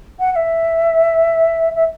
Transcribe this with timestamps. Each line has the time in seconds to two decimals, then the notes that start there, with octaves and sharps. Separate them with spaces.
0.19 F#5
0.31 F#5
0.35 E5
1.75 E5